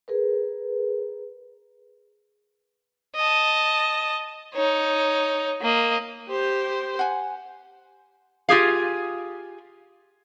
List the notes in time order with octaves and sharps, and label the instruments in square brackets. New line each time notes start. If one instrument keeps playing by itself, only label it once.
[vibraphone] G#4 A#4 B4
[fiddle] D#5 A5
D#4 C#5
A#3 D#5
[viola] G4 C5
[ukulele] F#5 G#5
[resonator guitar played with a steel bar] F4 G4 G#4 F5